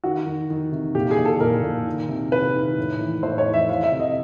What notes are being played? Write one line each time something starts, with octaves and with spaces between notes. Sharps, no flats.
D#3 F#4
D#3
D#3
C3
A#2 G4
G#4
A#2
A4
A#2 A#4
A#2
D#3
C3
C3 B4
D#3
A2
E3
A2 C5
C#5
E3
E5
E3 F5
E5
C3
D#5